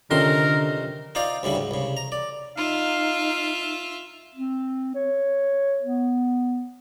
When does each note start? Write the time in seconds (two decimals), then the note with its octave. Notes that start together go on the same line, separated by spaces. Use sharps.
0.11 C2 D3 D#3 C#4 F4 A4 A#4 C6
1.15 D#4 F4 C5 D5 F5
1.43 D2 C#3 G3 E4
1.55 G#2
1.71 C2 C#3
1.97 A#5
2.12 D5
2.57 D#4 F4 E5 F5
4.35 C4
4.95 C#5
5.83 B3